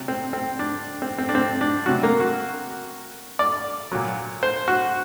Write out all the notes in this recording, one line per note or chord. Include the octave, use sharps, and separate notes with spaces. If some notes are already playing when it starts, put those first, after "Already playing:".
Already playing: C3 F#3
C4
C4
D4
C4
C4
D4
C4
D4
C3 F#3 F#4
A#3
F#4
D5
A#2 F#3
C5
F#4